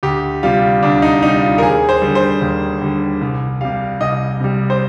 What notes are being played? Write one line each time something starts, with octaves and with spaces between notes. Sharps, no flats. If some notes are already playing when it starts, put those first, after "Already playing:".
D2 G4
C3 G3 F4
D2 D4
D#4
C3 G3 D#4
F4
A#4
D#2 G#4
C5
D3 G3
C5
D#2
D3 G3
C2
C3 G3 F5
C2 D#5
C3 G3
C5